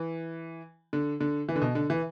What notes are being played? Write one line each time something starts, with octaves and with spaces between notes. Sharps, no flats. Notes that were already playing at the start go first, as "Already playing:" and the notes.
Already playing: E3
D3
D3
E3
D3
B2
D3
E3